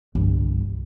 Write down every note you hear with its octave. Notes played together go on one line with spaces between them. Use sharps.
G1 C2